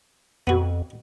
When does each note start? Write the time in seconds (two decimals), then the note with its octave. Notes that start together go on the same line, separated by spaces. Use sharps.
0.47 F2 B3 F#4